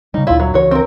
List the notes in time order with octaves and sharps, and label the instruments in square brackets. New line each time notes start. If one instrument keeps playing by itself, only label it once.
[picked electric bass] C#3 G3 [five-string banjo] D#4
[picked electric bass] D2 A#2 [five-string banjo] E4 F4
[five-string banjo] F#3
[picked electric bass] C#2 E3 [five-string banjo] F#4 C#5
[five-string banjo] C4 A#4